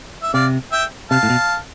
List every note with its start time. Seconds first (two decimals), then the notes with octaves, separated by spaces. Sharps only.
0.23 E5
0.34 C3 D5 F5
0.72 E5 G5
1.11 C3 F5 A5
1.23 A2
1.30 B2